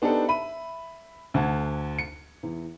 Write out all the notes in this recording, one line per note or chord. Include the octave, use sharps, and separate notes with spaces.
B3 D4 D#4 G4 A4 C5
E5 B5 D#7
D2 F#5 A5 G#6
C#7
E2